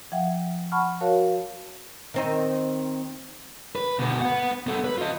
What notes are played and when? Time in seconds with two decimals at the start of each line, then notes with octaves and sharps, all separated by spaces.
0.12 F3 E5 F#5 G5
0.72 F#5 A5 B5 C#6 F6
1.01 F#4 A#4 C#5 F5 A5
2.14 D#3 C4 D#4
3.76 B4
3.99 D2 B2
4.21 B4 F#5
4.67 B3 A4
4.84 B4
4.98 F4 D#5